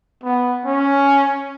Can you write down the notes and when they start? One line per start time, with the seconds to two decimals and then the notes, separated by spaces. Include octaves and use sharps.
0.24 B3
0.65 C#4